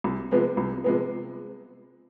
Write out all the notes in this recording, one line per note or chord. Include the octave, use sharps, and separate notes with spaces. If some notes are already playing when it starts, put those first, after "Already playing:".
C2
C3 F3 G#3 B3
C2
C3 F3 G#3 B3